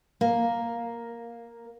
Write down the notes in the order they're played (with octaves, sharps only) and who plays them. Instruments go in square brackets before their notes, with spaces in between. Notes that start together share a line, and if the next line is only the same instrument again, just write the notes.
[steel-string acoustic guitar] A#3